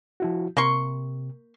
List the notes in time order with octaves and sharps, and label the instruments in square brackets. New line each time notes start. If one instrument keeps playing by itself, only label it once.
[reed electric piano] F3 E4 F#4
[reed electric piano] C3 [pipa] A#3 C6 C#6